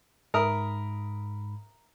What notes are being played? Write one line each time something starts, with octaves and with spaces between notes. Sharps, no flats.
G#2 A#4 E5 B5 D#6